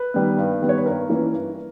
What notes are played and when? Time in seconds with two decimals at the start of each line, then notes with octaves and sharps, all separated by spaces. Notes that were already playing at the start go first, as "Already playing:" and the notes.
Already playing: B4
0.14 D#3 G3 B3
0.38 G2
0.62 D#3 G3 B3
0.69 C#5
0.78 B4
0.86 G2 A#4
1.10 E3 A#3 C#4
1.34 G2